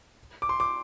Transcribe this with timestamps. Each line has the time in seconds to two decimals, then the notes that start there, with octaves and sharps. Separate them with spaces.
0.42 D6
0.49 C6
0.60 D6